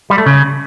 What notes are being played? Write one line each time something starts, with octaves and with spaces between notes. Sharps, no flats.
G3
A3
C#3